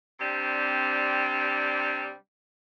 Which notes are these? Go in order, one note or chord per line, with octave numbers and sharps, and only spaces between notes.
C3 G3 C4 D4